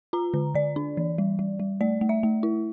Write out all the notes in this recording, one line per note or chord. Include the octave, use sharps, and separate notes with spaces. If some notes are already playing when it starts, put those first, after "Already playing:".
F4 A#5
D3
D3 D5
D4
E3
G3
G3
G3
A3 D5
A3
E5
A3
E4